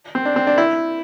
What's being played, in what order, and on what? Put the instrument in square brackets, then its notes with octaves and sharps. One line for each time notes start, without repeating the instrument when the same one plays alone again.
[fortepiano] C4
D4
C4
D4
E4